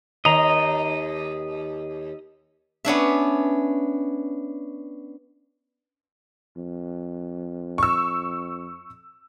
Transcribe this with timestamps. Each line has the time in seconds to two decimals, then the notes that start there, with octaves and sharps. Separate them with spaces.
0.25 D#2 D#5 A#5
2.85 B3 C#4 D4 E5
6.56 F2
7.78 C#6 E6